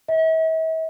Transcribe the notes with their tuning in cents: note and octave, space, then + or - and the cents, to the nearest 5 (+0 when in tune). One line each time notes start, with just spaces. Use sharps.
E5 -45